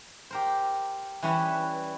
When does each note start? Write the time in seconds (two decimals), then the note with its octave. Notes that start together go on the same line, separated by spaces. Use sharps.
0.31 G4 A#4 C5
1.23 E3 G3 C#4 E4 B4